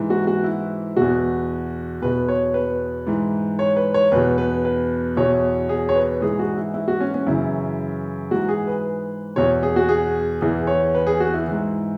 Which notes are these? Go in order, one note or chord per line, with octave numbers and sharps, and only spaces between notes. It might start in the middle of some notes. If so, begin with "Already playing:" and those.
Already playing: G#2 E3
F#4
F#4
E4
E2 B2 F#4
E2 B2 B4
C#5
B4
G#2 E3
C#5
B4
C#5
E2 B2 B4
B4
B4
E2 B2 C#5
G#4
C#5
B4
G#2 E3 G#4
F#4
E4
E4
F#4
C#4
C#4
F#2 C#3 E3 E4
G#2 E3 F#4
G#4
B4
E2 B2 C#5
G#4
F#4
G#4
E2 E3 G#4
C#5
B4
G#4
F#4
E4
G#2 E3